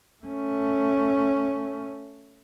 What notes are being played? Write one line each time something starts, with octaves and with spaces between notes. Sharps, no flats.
A3 C#4